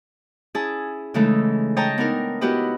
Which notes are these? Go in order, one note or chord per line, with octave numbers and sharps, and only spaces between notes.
C#4 E4 G#4 A5
C#3 E3 G#3 A3 D#4 A4
C#5 D#5 G5 A5 A#5
B3 D4 D#4 A#4
B3 E4 F#4 G4 B4 D#5